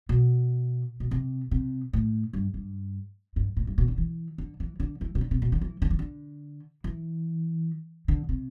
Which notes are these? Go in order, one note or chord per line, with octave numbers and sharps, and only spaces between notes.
B2
B2
C3
C3
A2
G2
G2
G2
A2
G2
B2
D3
E3
D3
E3
D3
E3
C3
D3
C3
B2
D3
E3
D3
E3
D3
E3
D3
C3